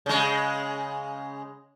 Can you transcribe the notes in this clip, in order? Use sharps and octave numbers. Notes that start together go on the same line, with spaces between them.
C#3 G#3